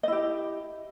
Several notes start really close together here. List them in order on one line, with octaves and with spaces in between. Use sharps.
D#5 E4 G4